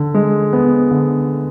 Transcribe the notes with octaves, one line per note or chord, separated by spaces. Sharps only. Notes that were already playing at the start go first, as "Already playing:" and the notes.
Already playing: D3
G#3
B3
D3